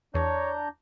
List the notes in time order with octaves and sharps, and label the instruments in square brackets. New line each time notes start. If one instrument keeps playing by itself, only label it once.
[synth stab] E2 [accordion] D4 A#5 G6 [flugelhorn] C#5